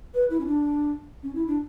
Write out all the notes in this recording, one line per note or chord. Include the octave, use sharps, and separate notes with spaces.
B4
E4
C#4
D4
C#4
E4
D4